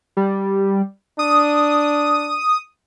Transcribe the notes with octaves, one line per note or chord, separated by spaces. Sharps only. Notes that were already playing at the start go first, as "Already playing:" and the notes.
G3
D4 D#6